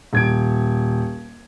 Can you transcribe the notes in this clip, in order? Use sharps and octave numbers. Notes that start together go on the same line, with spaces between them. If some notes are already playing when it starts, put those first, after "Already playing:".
D#1 G#6 D7